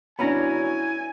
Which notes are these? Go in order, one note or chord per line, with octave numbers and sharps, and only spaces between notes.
F#3 B3 C#4 D4 E4 G#5 A#5 B5